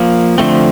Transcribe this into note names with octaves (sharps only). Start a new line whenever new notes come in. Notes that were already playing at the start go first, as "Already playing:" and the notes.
Already playing: F3 A#3
D3 F3 A3 C4